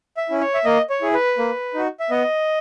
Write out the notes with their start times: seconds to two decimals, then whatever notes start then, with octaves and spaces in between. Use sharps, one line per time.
0.17 E5
0.29 C#4 E4
0.41 C#5
0.54 E5
0.65 A#3 D#5
0.90 C#5
1.01 E4 G#4
1.14 B4
1.38 A#3
1.74 D#4 F#4
2.00 E5
2.10 B3 D#5